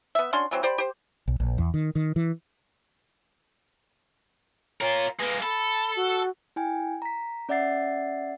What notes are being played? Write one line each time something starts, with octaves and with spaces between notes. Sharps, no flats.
B3 E5
C#4 D4 F#4 C6
E3 F#3 C4
G4 C5 D5 B5
G4 C5
B1
A#1
E2
D#3
D#3
E3
F4 A#4 C#5
G#3 A#3 B4
A4 B5
F#4
E4 G5 G#5
A#5 B6
C#4 D5 E5 F#5 A6 C7